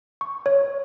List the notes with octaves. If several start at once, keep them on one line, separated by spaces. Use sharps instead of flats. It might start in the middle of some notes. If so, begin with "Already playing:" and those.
C#6
C#5